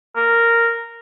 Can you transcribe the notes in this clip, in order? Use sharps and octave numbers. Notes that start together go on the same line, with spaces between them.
A#4